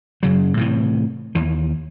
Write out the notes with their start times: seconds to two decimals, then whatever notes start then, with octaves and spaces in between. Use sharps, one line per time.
0.23 F#2 C#3 F#3
0.57 A2 C3 E3
1.35 D#2 E3